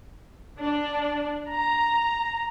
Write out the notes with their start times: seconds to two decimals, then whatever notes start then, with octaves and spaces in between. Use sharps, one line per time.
0.62 D4
1.55 A#5